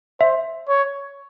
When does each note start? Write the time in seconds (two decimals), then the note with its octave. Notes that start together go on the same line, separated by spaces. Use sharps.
0.20 C5 E5
0.68 C#5